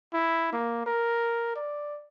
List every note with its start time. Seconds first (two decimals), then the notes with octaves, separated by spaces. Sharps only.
0.14 E4
0.53 A#3
0.86 A#4
1.56 D5